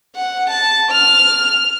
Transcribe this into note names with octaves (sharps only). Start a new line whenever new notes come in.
F#5
A5
F6